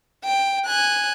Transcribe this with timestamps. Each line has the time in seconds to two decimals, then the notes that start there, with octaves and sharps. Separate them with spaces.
0.24 G5
0.66 G#5 F#6